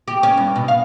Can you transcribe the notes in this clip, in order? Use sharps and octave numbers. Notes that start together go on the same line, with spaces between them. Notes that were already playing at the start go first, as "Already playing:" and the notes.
G4
C#4
G2
B2
F5